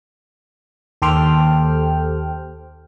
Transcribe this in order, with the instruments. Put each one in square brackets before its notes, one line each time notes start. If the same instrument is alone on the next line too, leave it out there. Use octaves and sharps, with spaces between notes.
[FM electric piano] D#2 G4 A4 C5 G5 F6